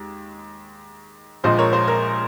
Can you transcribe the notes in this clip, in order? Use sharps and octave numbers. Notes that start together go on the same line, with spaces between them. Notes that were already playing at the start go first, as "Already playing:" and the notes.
Already playing: D#2 G#3
A#1 A#2 F3 G#3 C5 D#5
A#4 C#5
C5
A#4